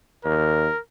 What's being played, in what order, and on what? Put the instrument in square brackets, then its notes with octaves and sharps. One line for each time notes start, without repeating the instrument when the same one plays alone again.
[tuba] D#2 [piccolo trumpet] A#4